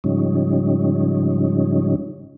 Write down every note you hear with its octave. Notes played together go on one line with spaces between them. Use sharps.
G#2 C#3 F3 G3 C#4 D#4